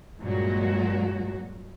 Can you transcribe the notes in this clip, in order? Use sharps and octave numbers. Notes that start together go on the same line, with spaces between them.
G2 A#2 F#3 G#3 F#4